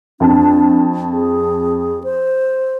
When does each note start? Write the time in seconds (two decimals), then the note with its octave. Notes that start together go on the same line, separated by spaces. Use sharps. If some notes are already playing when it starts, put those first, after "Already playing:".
0.20 F2 D4 A5
1.12 G#4
2.04 C5